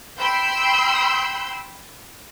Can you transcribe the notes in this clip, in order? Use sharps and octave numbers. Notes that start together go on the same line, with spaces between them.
G5 B5 C6 E6 G6